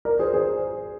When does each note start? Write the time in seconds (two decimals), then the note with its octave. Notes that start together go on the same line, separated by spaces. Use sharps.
0.05 A#4 D5
0.19 G#4 C5
0.33 G#4 C5